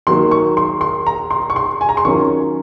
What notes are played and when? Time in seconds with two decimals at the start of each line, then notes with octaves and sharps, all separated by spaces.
0.07 D#3 F#3 A#3 C6
0.31 C#6
0.57 C6
0.81 C6
1.07 A#5
1.31 C6
1.50 C#6
1.56 C6
1.81 G#5
1.89 A#5
1.97 C6
2.05 D#3 F#3 C#4 F4 C#6